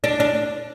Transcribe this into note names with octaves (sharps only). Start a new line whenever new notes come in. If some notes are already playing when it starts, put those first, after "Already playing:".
D4
D4